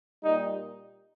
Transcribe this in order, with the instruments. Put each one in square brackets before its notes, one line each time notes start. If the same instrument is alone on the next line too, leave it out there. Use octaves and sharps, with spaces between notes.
[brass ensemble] A#2 G3 D#4